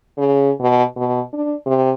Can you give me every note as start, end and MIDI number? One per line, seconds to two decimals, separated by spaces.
0.18 0.51 49
0.60 0.83 47
0.96 1.21 47
1.33 1.54 62
1.66 1.93 48